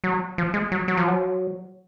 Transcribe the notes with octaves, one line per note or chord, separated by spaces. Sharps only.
F#3
F3
G#3
F#3
F#3
F3
F#3